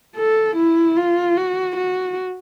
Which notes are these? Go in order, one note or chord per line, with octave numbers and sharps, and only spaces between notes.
A4
E4
F4
F#4
F#4